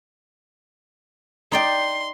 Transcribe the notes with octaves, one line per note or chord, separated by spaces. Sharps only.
D#4 D5 G5 C6